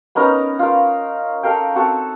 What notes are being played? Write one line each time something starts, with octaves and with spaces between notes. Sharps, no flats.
B3 C#4 D#4 A#4
F4 A#4
A4 A#4 F5 G5
C4 F#4 A4